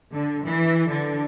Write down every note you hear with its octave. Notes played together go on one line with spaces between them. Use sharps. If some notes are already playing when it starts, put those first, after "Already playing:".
D3
E3
D3